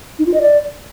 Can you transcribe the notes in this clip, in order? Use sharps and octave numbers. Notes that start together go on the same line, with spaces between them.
D#4
F4
D#5
D5